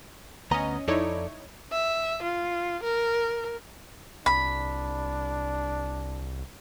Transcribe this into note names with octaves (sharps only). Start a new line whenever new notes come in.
D2 B3 C#4 D#5 A#5
F2 D#4 E4 A4 C#5 D5
E5
F4
A#4
C2 D4 B5